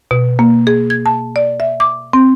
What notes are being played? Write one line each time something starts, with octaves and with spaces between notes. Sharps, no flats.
B2
A#3
G#4
G#6
A5
D5
E5
D6
C4